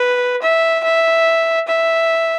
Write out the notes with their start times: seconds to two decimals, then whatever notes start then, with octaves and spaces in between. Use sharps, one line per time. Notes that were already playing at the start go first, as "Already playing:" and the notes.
Already playing: B4
0.42 E5
0.84 E5
1.68 E5